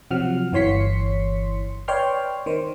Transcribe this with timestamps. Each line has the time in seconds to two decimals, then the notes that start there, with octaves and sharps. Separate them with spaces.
0.11 C3 F3 F#3 F#5 F6
0.52 G1 E3 C#5 C6 B6 C#7
1.88 B4 C#5 D5 G5 C6 F6
2.46 D#3 C5